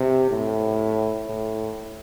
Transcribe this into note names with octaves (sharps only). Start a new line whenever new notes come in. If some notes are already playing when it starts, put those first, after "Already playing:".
Already playing: C3
A2
A2